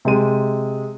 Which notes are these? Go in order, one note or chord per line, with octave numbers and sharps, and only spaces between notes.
C3 G#3 D#7